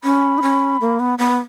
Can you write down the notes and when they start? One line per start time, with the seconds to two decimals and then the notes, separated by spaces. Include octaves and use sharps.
0.03 C#4 B5
0.38 D#4
0.42 C#4
0.81 A#3
1.00 B3
1.19 B3